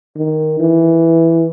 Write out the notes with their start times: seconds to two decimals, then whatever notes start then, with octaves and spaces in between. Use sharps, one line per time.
0.17 D#3
0.60 E3